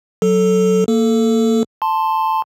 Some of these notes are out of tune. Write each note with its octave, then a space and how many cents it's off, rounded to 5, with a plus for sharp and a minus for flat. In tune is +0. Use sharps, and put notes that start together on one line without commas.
F#3 +0 A4 +0
A#3 -15 A4 +0
A5 +0 C6 +0